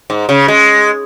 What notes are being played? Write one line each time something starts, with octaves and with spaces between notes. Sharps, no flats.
G#2
C#3
G#3